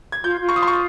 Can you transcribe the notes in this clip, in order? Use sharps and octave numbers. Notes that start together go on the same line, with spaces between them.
G#6
F4 G6
F4
C#6
D#6
C6
C#6